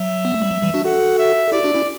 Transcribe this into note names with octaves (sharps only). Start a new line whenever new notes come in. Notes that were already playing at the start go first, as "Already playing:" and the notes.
Already playing: F#3 E5
B3
A3
G3
F#3
E3 G3
D4 F#4
F#4 A4 F#5
E5
A4
E4 G4 D5
D4 F#4
C#4 E4